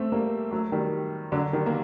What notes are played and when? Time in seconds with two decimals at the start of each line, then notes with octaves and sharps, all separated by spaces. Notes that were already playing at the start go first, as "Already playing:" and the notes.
Already playing: A3 C4
0.12 G3 A#3
0.51 F#3 A3
0.72 D#3 G3
1.32 D3 F#3
1.53 D#3 G3
1.66 A#3